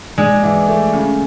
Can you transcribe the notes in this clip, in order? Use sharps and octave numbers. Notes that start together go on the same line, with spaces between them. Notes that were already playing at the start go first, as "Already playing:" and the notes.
G#3 D4
E3
A3
C#3